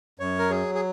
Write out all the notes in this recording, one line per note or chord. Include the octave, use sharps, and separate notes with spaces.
F#2 C#5
A#4
F#3 G#4
G#4